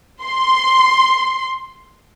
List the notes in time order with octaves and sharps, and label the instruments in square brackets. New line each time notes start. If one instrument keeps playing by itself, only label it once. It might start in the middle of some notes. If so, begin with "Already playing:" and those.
[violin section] C6